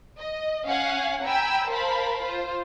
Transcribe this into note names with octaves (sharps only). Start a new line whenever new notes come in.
D#5
C#4 F5 F#5 G#5
G5 G#5 A#5 B5 E6
A#4 C5 F5 A5 B5
F4 C5